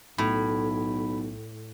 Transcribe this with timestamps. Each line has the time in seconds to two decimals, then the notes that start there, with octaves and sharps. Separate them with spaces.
0.18 B1 A2 B5